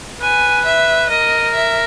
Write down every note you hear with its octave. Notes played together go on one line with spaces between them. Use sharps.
B4 G#5
E5
A#4 D#5
E5